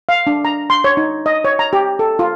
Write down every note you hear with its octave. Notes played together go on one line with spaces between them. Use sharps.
F5
D4
A#5
C6
C#5
D#4
D#5
C#5
A#5
G4
A4
F4